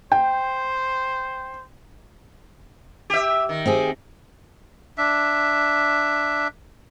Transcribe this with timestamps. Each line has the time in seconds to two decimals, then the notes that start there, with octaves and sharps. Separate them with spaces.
0.12 C5 G5
3.10 G4 E5
3.49 D#3
3.66 C4 G4 G#4
4.98 D4 E5